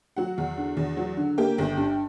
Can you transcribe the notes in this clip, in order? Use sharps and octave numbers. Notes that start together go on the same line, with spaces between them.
F#3 F#4 F#5
E2
D3
E2
F#3
D3
A#3 G4 G5
G1
G2